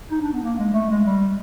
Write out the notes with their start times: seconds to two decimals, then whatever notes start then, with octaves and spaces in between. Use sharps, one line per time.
0.11 D#4
0.21 D4
0.32 B3
0.43 A#3
0.59 G#3
0.74 A3
0.90 G#3
1.06 G3